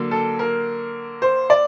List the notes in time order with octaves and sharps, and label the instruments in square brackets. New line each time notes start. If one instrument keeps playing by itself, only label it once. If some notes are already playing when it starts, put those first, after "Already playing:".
Already playing: [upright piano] D3 F#3 A#3
A4
A#4
C5
D5